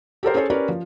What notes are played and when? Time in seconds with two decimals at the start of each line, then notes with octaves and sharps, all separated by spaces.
0.23 G4 A4 A#4 C5
0.34 C#4 G#4 A4 C5 C#5
0.50 C#4 G4 A#4 B4 C#5 D5
0.69 F3